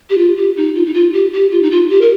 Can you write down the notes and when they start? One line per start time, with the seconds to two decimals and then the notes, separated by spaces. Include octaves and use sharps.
0.10 G4
0.18 F4
0.36 G4
0.57 D#4
0.75 F4
0.86 D#4
0.94 F4
1.13 G4
1.33 G4
1.51 F4
1.63 D#4
1.71 F4
1.90 G4
2.01 A#4